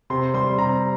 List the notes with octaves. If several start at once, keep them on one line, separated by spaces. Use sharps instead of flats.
C3 C6
G3 C6
C3 A#5